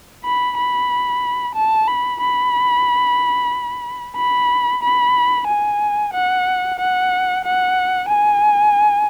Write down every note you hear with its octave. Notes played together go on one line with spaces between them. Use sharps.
B5
B5
A5
B5
B5
B5
B5
G#5
F#5
F#5
F#5
G#5